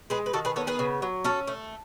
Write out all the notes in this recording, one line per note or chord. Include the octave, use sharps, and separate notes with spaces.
G#3 G#4 B4
B4
D#3 F#4 A4
G#4 B4
B3 A4 C#5
G#4 B4
C#3
F#3
C#4 F#4 A4
A3